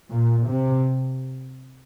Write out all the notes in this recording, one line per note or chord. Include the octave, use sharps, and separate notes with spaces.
A#2
C3